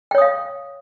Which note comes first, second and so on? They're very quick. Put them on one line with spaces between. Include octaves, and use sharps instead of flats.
G5 C#5 D#6 F5